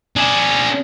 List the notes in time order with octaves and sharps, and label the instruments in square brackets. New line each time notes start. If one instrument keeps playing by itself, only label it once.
[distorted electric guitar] D4 G#4